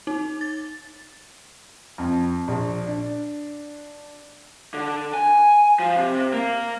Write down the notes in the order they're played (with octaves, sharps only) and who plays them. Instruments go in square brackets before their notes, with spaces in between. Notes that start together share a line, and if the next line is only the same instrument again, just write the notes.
[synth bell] D#4
A6
[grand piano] F2
A#1
D4
[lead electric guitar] D3
G#5
F3
C3
A#3